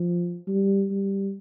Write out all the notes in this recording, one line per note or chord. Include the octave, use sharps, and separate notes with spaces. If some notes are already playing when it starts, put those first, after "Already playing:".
Already playing: F3
G3
G3